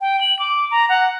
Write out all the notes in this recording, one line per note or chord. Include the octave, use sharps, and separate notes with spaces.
G5
F#7
D6
A#5
F#5